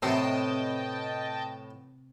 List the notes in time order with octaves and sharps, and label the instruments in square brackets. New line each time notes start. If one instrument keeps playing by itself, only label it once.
[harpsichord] A2 B3 [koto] C3 A3 C4 [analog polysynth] D#5 G5 A5